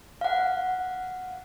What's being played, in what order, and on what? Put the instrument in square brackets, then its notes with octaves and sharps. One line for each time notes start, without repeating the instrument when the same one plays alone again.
[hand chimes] F5 F#5